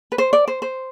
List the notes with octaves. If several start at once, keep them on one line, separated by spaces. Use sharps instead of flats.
B4
C5
D5
C5
C5